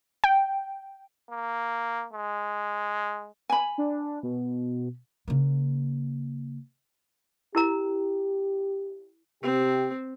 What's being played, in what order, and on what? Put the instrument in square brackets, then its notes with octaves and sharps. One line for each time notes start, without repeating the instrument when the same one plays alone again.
[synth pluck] G5
[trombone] A#3
G#3
[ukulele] G#5 B5
[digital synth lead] D4
B2
[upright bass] C#3 A#3
[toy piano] E4 A#4 A#5 [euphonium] G4
[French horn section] C3 G4 [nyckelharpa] C4